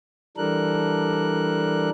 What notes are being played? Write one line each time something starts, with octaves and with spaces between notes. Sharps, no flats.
E3 G3 D4 A4 A#4 F#6